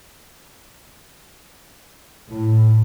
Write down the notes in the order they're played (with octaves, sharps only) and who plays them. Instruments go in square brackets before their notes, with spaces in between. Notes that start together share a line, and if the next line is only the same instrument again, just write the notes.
[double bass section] A2